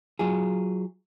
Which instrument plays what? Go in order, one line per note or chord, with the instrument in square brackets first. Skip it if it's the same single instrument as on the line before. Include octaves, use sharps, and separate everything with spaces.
[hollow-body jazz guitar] F#3 F4 G#4